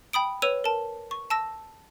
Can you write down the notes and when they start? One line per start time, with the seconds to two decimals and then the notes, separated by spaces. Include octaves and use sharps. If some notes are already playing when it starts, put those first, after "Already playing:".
0.13 G5 B5 D#6 D7
0.42 B4 C#5 E6 D#7 F7
0.64 A#4 A5
1.11 C#6
1.30 A5 E6 A#6